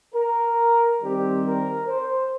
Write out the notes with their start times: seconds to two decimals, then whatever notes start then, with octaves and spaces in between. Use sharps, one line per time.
0.14 A#4
1.01 D#3 G3 C4 G4
1.44 A#4
1.87 C5